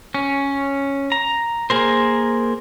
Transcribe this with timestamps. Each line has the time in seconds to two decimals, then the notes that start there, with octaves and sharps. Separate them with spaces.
0.14 C#4
1.12 A#5
1.70 A#3 G#4 A#4 C5